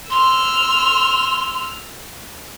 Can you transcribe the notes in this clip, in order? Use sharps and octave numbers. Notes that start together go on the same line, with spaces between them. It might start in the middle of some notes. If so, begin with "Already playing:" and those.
C6 E6 F6